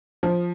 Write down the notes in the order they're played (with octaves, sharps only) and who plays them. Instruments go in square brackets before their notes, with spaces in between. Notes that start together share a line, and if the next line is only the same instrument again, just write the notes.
[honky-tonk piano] F3